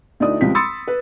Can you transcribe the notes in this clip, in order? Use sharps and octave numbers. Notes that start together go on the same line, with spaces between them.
D2 D#4 E4 D5 D#6
C#2 F3 G3 C4 B6
B5 C6 D#6 E6 A6 C#7
B4